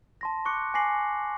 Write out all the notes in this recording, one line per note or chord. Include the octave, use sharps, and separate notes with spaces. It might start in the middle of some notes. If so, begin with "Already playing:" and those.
A5 C6 A#6
C#6 D6 F#6 C#7
G#5 D6 A#6 C7 F#7